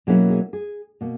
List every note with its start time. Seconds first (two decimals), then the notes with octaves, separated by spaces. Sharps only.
0.07 B2 F#3 A#3 C#4 E4 G#4
0.30 G#4
0.53 G#4
1.01 B2 A#3